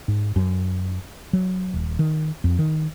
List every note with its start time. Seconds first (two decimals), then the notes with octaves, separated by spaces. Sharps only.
0.08 G#2
0.36 F#2
1.33 F#3
1.74 D#1
1.99 D#3
2.44 F2
2.59 D#3